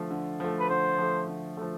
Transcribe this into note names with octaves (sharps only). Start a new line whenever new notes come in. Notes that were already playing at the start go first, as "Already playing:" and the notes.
Already playing: D3 F3 A3
D3
F3 A3
B4
D3 C5
F3 A3
D3
F3 A3